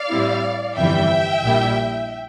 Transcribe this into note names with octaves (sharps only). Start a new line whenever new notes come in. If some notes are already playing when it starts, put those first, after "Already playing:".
Already playing: D5 F5
A2 G3 C4 E4
G1 F2 E3 G3 E5 G5
A#1 A#2 G3 A#3 E4